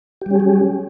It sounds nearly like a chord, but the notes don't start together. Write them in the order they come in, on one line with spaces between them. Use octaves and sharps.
G4 G3 C#4 G#4 F#3